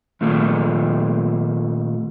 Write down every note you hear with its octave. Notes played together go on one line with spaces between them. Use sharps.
A#2 D#3 A3 F4 A4